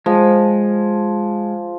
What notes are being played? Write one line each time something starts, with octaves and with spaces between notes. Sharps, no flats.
F3 G#3